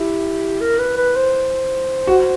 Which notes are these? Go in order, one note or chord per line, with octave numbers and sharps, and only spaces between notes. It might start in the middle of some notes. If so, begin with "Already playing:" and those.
Already playing: E4 G4
A#4
B4
B4
C5
F#4